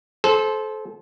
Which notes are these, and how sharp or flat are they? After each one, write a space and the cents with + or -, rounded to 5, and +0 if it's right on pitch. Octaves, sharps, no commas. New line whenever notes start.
A4 -30 C5 +0